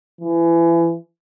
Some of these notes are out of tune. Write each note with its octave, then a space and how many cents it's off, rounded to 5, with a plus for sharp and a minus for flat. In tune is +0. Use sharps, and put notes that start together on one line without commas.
E3 +30